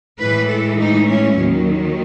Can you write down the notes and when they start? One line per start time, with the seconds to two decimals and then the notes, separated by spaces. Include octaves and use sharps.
0.19 A2 E3 G#3 B4
0.48 A4
0.77 D#4
1.07 C#4
1.35 D#2 D#3 F#3